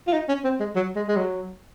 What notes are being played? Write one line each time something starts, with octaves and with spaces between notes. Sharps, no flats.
F4
D#4
C#4
C4
G#3
F#3
G#3
G#3
F#3